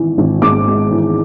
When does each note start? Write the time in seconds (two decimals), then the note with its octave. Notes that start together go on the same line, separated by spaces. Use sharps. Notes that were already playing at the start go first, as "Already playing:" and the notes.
Already playing: G#1 E3
0.18 G#1
0.42 G#2 D6
0.67 G#3
0.91 E3